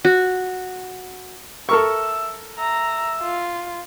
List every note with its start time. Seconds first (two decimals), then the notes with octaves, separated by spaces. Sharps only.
0.05 F#4
1.69 A4 A#4 E5 C#6
2.59 E5 A#5
3.22 F4